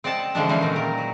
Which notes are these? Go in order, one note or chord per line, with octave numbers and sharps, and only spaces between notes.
C4 D5 D#5 F#5 A5
D3 E3 F3 G#3 C#4 D4
D#3 E3 G3 C4 C#4
A#2 D#4
A#4
F#3